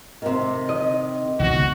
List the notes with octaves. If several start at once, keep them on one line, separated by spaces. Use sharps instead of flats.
C3 D#3
D#5
C#2 B2 D#3 F#4